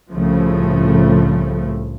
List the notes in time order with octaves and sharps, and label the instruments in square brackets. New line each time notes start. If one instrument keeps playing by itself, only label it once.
[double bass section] C2 A2 C#3 F3 A3